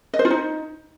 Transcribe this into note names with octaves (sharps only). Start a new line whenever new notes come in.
D#5
C5
F4
D#4